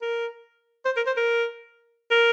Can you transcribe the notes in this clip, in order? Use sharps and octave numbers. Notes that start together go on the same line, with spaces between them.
A#4
C5
A#4
C5
A#4
A#4